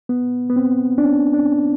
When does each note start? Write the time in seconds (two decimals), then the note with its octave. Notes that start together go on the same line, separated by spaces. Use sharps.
0.09 B3
0.50 B3
0.56 C4
0.98 D4
1.03 C#4
1.34 D4